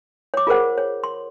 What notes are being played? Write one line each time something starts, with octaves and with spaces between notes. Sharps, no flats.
C#5 D6
F4 G#4 A#4 C5 F#5
C#5
C6